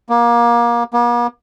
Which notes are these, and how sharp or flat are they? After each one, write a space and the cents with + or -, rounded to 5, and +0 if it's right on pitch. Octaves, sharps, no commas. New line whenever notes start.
A#3 +25
A#3 +45